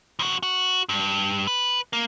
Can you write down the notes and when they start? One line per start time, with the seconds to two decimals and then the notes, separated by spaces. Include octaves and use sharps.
0.19 F2 F#4
0.43 F#4
0.89 G2
1.47 B4
1.93 A#3